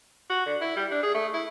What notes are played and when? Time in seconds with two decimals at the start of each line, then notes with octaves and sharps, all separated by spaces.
0.30 F#4
0.46 D3
0.61 E4
0.76 G3
0.91 D4
1.03 G#4
1.14 A3
1.33 E4